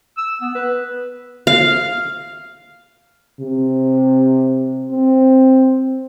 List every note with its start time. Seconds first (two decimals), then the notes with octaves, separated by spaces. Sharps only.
0.17 E6
0.41 B3
0.55 B4
1.47 F5
3.40 C3
4.92 C4